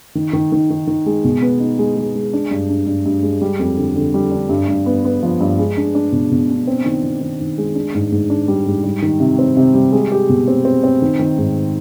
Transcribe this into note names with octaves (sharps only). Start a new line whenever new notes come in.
D#3
D#3
D#3
D#3
D#3
G#3
B2
B3
D#4
G#3
G#3
G#3
D4
G2
D4
G2
G2
G#3
G3
F2
D3
D3
G3
D4
G2
G2
B3
B3
F3
G2
G#3
D4
D4
B2
B2
D4
C4
D#3
D#3
D#3
D#3
G#3
D4
G#2
G#2
D4
G3
G#2
G3
D#3
C3
C4
C3
G3
G#3
G4
B2
C4
C4
C4
D#3
D#3
G#2